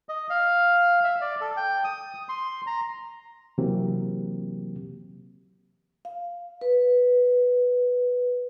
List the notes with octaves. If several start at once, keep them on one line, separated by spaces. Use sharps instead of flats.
D#5
F5
E5
D5
A4
G5
D#6
C6
A#5
C3 E3 F#3 A#3 C4 G4
F5
B4